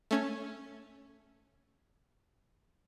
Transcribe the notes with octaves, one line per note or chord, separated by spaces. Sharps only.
A3 C#4 G#6